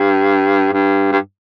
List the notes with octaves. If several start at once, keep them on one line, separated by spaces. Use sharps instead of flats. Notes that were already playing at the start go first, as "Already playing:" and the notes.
Already playing: G2
G2
G2